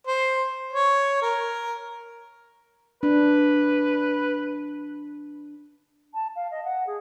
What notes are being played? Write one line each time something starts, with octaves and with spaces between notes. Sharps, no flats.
C5
C#5
A#4
D4 B4
A5
F5
D#5
F#5
G#4